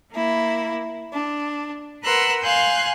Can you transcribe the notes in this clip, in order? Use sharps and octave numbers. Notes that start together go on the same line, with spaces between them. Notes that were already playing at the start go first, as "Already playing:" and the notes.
A#3 E4
D4
A#4 B4 F#5 C6 E6 F#6
F5 G#5 C6 F#6 G6